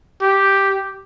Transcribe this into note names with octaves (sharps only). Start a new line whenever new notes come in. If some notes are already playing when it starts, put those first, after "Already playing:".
G4